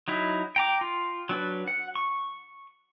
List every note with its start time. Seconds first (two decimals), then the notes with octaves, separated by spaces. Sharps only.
0.08 F#3 D#4 E4
0.56 G5 A#5 D6
0.81 F4
1.29 F#3 D4 B4
1.68 F#5
1.95 C#6